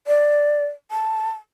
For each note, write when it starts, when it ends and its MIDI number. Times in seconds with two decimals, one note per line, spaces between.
0.07 0.65 74
0.91 1.30 81